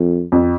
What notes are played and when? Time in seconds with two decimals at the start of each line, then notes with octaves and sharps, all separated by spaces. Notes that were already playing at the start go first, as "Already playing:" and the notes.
Already playing: F2
0.32 F2